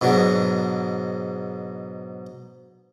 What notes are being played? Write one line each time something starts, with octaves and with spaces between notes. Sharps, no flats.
G#2 B2 F#3 D4